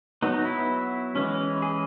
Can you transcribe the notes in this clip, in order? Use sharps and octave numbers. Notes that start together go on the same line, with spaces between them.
F#3 B3 D#4
E4
E3 G#3 C#4
G#4